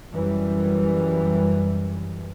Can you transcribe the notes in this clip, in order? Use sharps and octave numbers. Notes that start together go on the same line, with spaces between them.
F#2 E3 G3